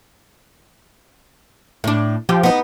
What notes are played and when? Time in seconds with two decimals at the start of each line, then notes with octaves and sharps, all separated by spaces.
1.84 A2 D4
2.29 F3 G4
2.43 B3 D#4